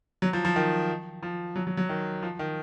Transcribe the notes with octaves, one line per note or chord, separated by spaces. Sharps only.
F#3
F3
F3
D#3
F3
F#3
F#3
F#3
D#3
F3
D#3